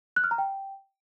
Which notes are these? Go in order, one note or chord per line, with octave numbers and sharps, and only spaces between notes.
F#6
F6
A#5
G5